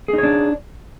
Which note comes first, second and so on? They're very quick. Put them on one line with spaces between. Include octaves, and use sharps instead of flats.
G#4 D#4 C#5 D4